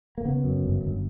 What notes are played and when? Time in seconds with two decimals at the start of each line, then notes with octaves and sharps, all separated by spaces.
0.18 A#3
0.25 C#3 B3
0.44 F#2
0.64 G1
0.83 G1